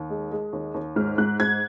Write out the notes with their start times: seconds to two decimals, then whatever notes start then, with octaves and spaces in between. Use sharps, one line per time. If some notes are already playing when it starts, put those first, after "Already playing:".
Already playing: D#2
0.10 G#3
0.31 G#3
0.53 D#2
0.74 D#2
0.96 G#2 F6
1.18 G#2 F#6
1.40 G#2 G#6